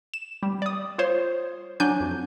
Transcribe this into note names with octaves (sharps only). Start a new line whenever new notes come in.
E7
G3
D5 D#6
F4 C5 C#5
F#3 D4 G#5 G6
F2